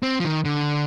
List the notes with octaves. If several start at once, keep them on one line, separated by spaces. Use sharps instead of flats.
C4
F3
D#3
D3